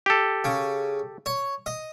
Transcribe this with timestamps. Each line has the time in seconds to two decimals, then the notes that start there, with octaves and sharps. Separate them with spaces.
0.06 G4 A4
0.44 C#3
1.26 C#5
1.66 D#5